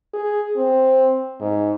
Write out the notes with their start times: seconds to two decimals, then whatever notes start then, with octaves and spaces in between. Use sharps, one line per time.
0.14 G#4
0.57 C4
1.40 G#2